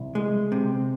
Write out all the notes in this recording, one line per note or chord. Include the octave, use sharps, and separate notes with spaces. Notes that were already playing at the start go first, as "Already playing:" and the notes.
Already playing: C2
G#3
C3